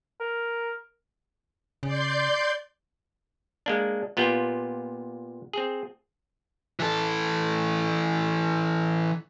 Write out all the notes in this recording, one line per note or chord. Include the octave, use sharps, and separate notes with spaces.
A#4
C#3 D5 C6 G6
G#3 A#3 D4
A#2 B3 F4 G4 G5
C4 G#4
E3 A4